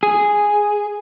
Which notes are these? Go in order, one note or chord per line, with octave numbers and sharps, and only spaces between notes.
G#4